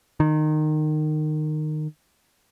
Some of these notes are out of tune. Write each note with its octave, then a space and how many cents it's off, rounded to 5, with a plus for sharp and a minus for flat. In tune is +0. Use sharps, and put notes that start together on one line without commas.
D#3 -20